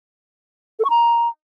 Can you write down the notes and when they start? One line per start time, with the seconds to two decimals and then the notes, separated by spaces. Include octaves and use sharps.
0.79 A4
0.85 C#6
0.90 A#5